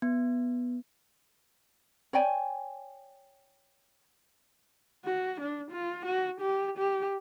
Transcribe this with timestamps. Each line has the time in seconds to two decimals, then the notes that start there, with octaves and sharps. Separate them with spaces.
0.02 B3
2.13 C#5 D5 G5 G#5
5.05 F#4
5.41 D4
5.71 F4
6.06 F#4
6.41 G4
6.78 G4